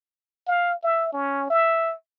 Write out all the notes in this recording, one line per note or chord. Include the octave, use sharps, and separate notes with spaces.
F5
E5
C#4
E5